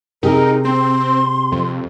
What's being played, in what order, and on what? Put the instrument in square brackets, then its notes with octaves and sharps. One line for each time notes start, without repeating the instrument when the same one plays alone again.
[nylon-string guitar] C3 G#4 [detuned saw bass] D#4 [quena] A#4
[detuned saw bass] C4 [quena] C6
[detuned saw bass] F2